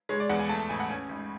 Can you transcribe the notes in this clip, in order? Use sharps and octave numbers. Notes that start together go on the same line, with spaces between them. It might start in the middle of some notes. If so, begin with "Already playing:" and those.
G#3 C#5
D5
E2 F#5
G#5
A3 A5
A5
A1 G#5
F#5
C#4 G#5
G#1